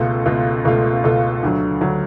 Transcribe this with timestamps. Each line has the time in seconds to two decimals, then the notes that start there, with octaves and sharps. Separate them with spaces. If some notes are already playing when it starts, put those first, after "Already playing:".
Already playing: C#2 B2 A3 F4 A4
0.26 C#2 B2 A3 F4 A4
0.65 C#2 B2 A3 F4 A4
1.03 C#2 B2 A3 F4 A4
1.43 D2 D3 F#3
1.81 D2 D3 F#3